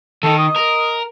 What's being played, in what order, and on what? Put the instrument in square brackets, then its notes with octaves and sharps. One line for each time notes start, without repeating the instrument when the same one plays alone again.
[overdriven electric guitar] D#3 D#4 [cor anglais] A4
[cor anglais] D#5
[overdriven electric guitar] A#4